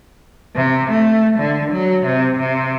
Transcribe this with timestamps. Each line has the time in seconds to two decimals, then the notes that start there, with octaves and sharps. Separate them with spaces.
0.56 C3
0.90 A3
1.38 D3
1.71 F#3
2.06 C3
2.39 C3